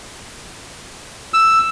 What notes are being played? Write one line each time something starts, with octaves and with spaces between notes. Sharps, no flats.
E6